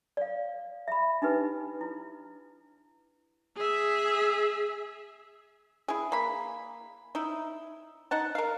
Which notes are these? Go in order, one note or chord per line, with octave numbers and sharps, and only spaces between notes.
D5 F5
E5 B5
D4 D#4 G4 B4
E4
G#4 E5
E4 G#4
A#3 B5
D#4 E4
D#4 F#5 A5
A#4 F5